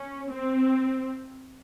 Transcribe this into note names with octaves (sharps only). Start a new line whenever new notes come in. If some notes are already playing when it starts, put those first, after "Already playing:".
Already playing: C#4
C4